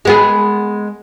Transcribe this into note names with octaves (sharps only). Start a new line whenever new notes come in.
G#3 B3 G#4